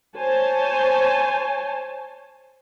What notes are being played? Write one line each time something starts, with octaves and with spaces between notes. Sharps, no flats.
C5 C#5 G#5 A5